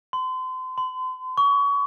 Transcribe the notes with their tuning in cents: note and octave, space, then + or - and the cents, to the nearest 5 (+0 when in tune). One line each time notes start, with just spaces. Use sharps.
C6 -35
C6 -40
C#6 +30